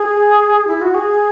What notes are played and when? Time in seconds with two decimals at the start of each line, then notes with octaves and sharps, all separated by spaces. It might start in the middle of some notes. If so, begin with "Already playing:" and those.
Already playing: G#4
0.67 E4
0.82 F#4
0.95 G#4